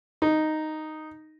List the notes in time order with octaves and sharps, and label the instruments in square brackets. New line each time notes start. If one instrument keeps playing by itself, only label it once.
[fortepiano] D#4